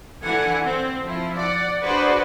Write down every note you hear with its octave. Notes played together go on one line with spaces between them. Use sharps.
D3 E3 E4 F#5 G#5
C4
F3 E4
D5 F#5
D4 F#4 G#4 B4 C5 D5